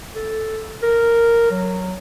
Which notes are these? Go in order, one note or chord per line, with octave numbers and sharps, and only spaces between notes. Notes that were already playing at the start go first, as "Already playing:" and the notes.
A4
A#4
F#3